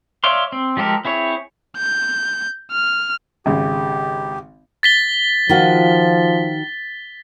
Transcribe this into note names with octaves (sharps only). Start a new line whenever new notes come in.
C#5 D5 E5 F5 C6
C4
F3 G#3 G4 A4 A#4
C4 E4 G#4 C#5
G6
F6
G#1 C#3 G4
A6 B6 G7
D#3 F3 F4 F#4